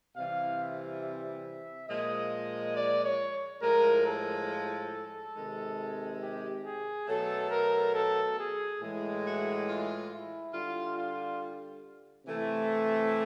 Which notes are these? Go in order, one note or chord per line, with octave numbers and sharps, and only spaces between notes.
C3 E3 G3 F5
E5
E5
A#2 F3 G#3 D#5
D5
C#5
A2 F3 G#3 A#4
A4
C3 D#3 G#3
G4
G#4
B2 F#3 A3 A4
A#4
A4
G#4
A2 E3 G#3
F#4
F4
E4
D3 G3 F4
F4
C3 E3 A3